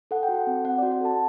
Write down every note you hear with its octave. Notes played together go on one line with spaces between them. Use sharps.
A4 F#5
G5
F#4
F#5
C4
C4 F#5
D5
F#4
F#5
A4 A5